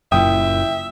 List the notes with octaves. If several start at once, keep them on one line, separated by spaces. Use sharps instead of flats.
F#1 F#2 A#2 E4 E5 G5 D#6